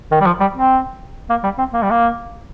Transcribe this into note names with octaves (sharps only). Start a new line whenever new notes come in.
D#3
G3
F3
G3
C4
A#3
G3
C4
A#3
G3
A#3